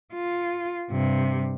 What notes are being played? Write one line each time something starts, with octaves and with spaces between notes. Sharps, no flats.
F4
G2 C3